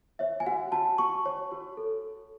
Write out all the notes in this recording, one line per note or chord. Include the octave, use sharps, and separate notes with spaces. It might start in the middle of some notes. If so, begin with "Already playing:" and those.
C#5 E5
G#5
F#4 F#5
F#4 A5
F#4 C#6
C#5
F#4
A4